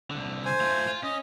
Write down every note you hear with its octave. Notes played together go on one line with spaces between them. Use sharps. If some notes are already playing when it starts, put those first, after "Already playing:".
C2 D3
C5 G#5
A3 F4
F4
C#4 D#5